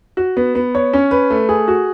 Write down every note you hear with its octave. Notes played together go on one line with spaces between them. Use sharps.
F#4
B3
B3
C#5
C#4
B4
A3
G#4
F#4